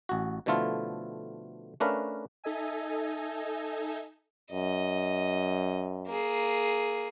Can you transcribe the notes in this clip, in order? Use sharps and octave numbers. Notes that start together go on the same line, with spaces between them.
A1 F#4
B2 D3 F3 A3 E4 F4
A3 C#4 D4 A#4 B4 F5
D#4 A4 D#5 E5 G#5
F#2 D#5
A#3 G#4